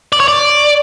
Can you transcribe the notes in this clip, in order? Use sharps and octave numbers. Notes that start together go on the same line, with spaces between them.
D5
C#5
D5